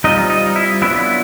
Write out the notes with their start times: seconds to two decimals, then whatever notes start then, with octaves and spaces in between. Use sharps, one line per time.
0.04 G3 C4 D#4 F4 D#5
0.29 D#4 D#5
0.56 E4 E5
0.82 F#3 B3 D4 E4 F4 E5